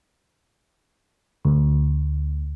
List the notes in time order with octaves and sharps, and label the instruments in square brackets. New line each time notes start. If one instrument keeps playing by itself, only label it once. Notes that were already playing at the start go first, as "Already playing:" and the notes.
[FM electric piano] D2